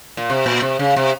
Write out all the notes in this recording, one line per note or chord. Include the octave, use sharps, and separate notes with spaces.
A#2
C3
A#2
C3
C#3
C3